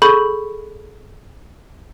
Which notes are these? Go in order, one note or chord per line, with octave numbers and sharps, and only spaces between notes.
G#4 A4 B5 C#6 G6 F#7